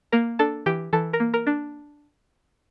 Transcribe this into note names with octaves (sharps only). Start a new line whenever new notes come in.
A#3 A#4 A#5
D4 A4 A5
E3 G4 G5
E3 A4 A5
A#4 A#5
A#3
A#4 A#5
D4